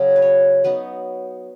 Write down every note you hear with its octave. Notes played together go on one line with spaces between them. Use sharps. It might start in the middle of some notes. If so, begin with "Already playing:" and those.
Already playing: C#3 F#3 C#4
B4
C#5
F#3 B3 D#4 B4